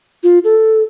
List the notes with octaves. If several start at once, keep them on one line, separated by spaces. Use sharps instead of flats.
F4
A4